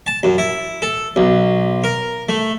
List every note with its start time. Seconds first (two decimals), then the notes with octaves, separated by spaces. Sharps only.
0.07 A5
0.23 F#2
0.38 E4
0.82 A4
1.16 B1
1.84 A#4
2.29 A3